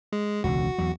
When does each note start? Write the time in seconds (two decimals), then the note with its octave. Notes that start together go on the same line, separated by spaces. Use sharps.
0.13 G#3
0.44 E1 C#2 D3 F#4
0.78 E2 F#3